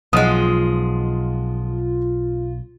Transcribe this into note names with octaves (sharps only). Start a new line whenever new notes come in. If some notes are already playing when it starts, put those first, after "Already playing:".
B1 F3 G#3 F4 D#5 F#5 D#6